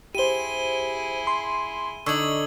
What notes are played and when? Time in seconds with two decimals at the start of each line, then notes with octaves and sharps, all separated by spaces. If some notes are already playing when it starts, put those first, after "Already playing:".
0.15 E4 G4 G#4 C5 D#7 G7
1.27 C6
2.06 D3 D#4 C#6 E6 G#6 F#7